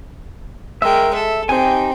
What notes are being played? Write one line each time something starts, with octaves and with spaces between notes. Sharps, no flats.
G#3 A#4 E5 G5
A4 E5
C4 D#4 G4 G5 G#5